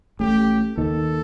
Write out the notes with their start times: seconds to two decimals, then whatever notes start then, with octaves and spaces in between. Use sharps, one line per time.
0.19 A1 A2 G4
0.77 D#2 D#3 A4